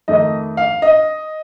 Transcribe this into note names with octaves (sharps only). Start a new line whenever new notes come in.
F2 D#3 A3 D#5
F5
D#5